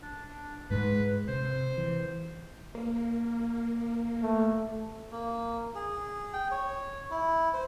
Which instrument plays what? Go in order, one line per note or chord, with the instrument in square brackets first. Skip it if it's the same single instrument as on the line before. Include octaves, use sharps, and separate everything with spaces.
[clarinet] D4
[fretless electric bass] G#2 G#3 [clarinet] B4
[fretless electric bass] C3 [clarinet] C5
[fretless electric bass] E3
[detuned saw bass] A#3
[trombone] A3
[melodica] A#3
G#4
G5
C#5
E4
C5